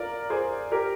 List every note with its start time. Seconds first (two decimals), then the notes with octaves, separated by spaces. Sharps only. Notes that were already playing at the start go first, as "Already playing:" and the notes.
Already playing: A#4 D5 F5
0.30 G#4 C5
0.72 G4 A#4